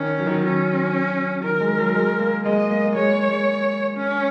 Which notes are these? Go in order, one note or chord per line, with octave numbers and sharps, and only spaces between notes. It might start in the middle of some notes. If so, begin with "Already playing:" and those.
Already playing: D#3 C#4
F#3
D#3
F#3
D#3 C#4
F#3
F#3
D#3 A#4
G#3
F#3
G#3
A#3
G#3 D#5
A#3
A#3
G#3 C#5
A#3
G#3
C#4